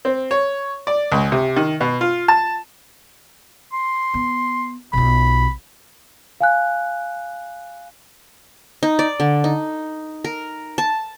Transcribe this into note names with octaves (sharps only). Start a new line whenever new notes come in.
C4
C#5
D5
C#2
C3
D#3
B2
F4
A5
C6
B3
B1 F4 B5
F5 G#5 F#6
D#4
D5
D3
D#4
A#4
A5